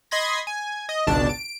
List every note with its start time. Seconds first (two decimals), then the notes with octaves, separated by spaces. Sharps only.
0.11 D#5 B5 C6 G#6 A#6
0.47 G#5
0.89 D#5
1.07 G#1 C#2 B2 D4 A5
1.29 D7